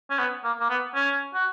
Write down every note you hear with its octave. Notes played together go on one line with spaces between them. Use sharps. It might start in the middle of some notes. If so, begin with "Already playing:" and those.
C#4
B3
A#3
A#3
B3
C#4
F#4